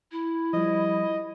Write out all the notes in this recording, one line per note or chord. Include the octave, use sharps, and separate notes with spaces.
E4
F3 G3 D#5